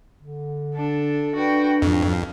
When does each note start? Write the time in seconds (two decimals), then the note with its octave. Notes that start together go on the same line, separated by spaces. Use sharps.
0.19 D3
0.74 D4 A4
1.36 D4 F#4 B4 G5
1.82 F2 G#2 F5